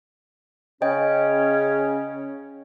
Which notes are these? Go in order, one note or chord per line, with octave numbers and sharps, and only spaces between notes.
C#3 C#4 C#5 D#5 G5